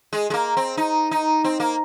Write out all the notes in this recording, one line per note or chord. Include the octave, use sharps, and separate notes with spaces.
G#3
G#3
A#3
C4
D#4
D#4
C4
A#3